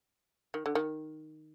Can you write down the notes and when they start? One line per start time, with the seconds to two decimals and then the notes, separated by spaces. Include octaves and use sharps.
0.54 D#3
0.66 D3
0.75 D#3